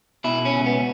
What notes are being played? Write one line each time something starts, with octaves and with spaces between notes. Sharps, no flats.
B2 E4
C#4
C#2
B3